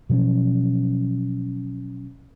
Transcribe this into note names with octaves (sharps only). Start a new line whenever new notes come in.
B2 F3 F#3 C#4